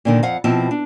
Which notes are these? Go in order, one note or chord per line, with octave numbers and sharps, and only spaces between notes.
A#2 D3 D#3
F2 F5 F#5
B2 F3 C4 E4 A5
D4